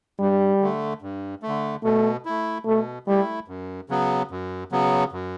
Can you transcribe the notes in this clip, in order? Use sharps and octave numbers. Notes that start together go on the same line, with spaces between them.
G2 G3
D3 A3
G2
A3
D3
B2 A3
A3 E4
B2 A3
G3 A3 E4
F#2
C#3 F#3 B3
F#2
C#3 F#3 B3
F#2